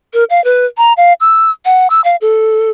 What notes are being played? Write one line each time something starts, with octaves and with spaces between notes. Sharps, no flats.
A#4
F5
B4
A#5
F5
E6
F#5
E6
F5
A4